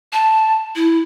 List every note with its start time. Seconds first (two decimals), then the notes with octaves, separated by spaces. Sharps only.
0.13 A5
0.76 E4